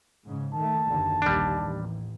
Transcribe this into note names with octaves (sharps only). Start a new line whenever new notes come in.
G#2 C#3
D#3 A3 A5
F#1 D#2 D3
A#1 D#2 G3 D4
A1